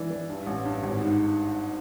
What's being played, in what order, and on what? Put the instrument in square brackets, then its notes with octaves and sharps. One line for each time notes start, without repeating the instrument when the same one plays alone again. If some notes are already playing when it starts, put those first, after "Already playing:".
Already playing: [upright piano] E3 D4
E3
G2
A1
G2
G#1
G#2